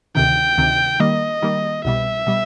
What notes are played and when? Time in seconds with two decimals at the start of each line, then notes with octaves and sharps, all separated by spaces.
0.15 D2 C3 D#3 G5
0.58 D2 C3 D#3
1.00 D#3 G3 A#3 D#5
1.42 D#3 G3 A#3
1.85 C2 B2 G3 E5
2.27 B2 G3